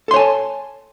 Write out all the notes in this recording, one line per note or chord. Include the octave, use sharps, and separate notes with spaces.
A4 C#5 G#5 A5 C6